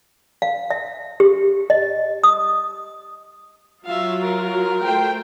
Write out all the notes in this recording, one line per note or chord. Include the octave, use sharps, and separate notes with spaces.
F5
E5
G4
D#5
D#6
F#3 F4 E5 F5
A#4
A3 C5 G5